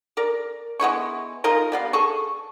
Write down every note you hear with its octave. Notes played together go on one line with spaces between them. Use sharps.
A#4 D5
G#3 B3 E4 C#6
D#4 F4 A#4
G3 B3 F5
G#4 A4 C#6